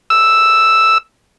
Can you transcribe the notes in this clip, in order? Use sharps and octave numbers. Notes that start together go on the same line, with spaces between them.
E6